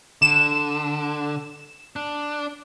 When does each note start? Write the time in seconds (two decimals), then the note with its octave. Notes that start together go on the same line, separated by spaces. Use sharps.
0.22 D3 E7
1.96 D4